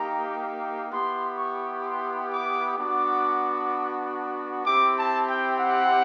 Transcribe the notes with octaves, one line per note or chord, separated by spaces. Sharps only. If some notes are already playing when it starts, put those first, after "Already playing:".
Already playing: A#3 D#4 G4 A#5
B3 E4 G4 C6
C#6
C6
D6
B3 D4 F#4 D6
C4 E4 G4 D6
A5
G5
F#5